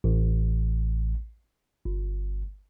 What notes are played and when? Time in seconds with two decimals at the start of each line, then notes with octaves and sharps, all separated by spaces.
0.04 A1
1.85 G1